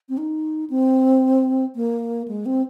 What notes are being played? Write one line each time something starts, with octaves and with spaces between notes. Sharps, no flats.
C4
D#4
C4
A#3
G#3
C4